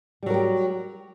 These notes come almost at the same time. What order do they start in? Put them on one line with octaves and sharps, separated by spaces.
G3 F#3 A#4 G4